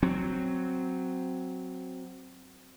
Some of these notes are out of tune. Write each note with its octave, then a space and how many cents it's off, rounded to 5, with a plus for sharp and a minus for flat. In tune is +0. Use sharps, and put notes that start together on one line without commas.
F#3 +0 C4 +0